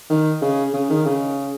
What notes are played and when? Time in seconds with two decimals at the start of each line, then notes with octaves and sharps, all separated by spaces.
0.10 D#3
0.41 C#3
0.73 C#3
0.90 D#3
1.05 C#3